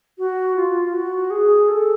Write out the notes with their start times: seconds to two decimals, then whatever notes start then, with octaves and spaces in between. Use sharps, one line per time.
0.18 F#4
0.56 F4
0.84 F4
0.93 F#4
1.30 G#4
1.68 A4